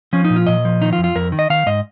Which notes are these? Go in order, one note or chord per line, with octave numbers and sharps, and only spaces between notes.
F3 C#4
D#4
A#2
F4
A#2 D#5
F3
D#3 D#4
F4
F2
F4
F2 A#4
D#3
D#5
D#3 F5
G#2 D#5